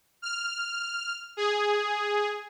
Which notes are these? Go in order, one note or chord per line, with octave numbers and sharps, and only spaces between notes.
F6
G#4